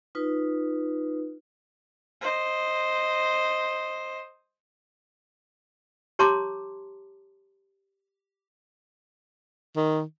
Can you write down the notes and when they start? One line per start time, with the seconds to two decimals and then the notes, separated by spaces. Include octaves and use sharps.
0.15 D#4 F4 B4
2.21 C5 D#5
6.19 G4 C#5 A5 A#5 C6 D6
9.76 D#3